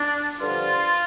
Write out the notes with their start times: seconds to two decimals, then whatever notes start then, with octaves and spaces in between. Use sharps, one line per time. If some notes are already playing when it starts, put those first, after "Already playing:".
Already playing: D4
0.41 G2 D3 F3 F4